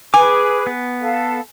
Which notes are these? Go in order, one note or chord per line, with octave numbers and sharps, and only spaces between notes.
G#4 B4 G#5 D6
B3
A4 F5